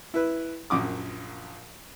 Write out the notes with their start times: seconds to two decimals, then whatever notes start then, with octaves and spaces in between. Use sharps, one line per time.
0.14 E4 B4
0.70 A#1 F#2 D6 D#6